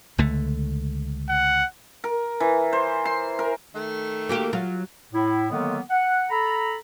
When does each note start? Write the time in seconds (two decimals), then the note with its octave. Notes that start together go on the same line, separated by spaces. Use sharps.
0.18 C#2 D3 A3
1.29 F#5
2.04 A#4
2.40 E3
2.73 C5
3.05 C6
3.39 A#4
3.75 D#3 A3
4.29 A#3 F#4 G4
4.53 F#3 F4
5.13 A2 E4
5.51 D3 D#3 F#3 G#3 A#3 B3
5.90 F#5
6.30 A4 A#5 B5